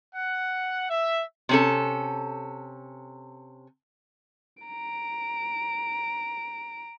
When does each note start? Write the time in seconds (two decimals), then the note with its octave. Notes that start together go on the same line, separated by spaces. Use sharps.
0.15 F#5
0.90 E5
1.49 C3 C#4 A4
4.63 A#5 D7